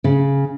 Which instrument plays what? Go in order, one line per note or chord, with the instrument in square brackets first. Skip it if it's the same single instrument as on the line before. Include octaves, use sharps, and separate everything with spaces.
[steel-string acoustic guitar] C#3